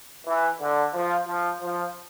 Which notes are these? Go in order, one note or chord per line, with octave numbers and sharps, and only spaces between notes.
E3
D3
F3
F3
F3